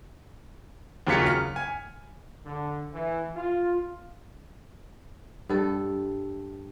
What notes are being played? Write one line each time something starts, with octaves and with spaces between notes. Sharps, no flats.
D#2 C#3 F#3 F4 B6 C#7
F6
G#5
D3
E3
F4
G2 A4